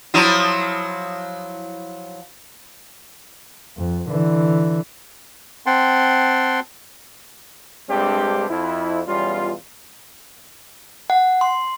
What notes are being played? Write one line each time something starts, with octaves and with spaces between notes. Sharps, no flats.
F3 F#3 E4
F2
D3 E3
C4 F#5 G5 A5 C6
C2 G2 G#3 C4 D4 G4
F2 E4
B1 E2 G3 C#4 F4
F#5
C6